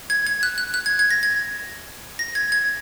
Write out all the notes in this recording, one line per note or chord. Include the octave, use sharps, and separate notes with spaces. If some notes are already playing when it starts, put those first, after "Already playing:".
G#6
G#6
F#6
F#6
F#6
G#6
G#6
A#6
G#6
A#6
G#6
G#6